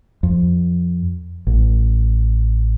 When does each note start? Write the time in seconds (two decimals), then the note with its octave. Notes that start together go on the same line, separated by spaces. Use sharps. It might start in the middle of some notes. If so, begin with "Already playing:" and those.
0.23 F2
1.47 A1